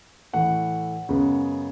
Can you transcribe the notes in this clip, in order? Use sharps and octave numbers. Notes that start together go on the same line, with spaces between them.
A2 E3 A3 F#5
F#2 C#3 G#3 B3